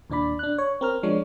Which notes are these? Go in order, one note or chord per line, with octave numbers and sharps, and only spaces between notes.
D#2 A#2 D4 D5 B5
D4 F#6
C#5
C4 A#4 F6
F3 G#3 D4 C#5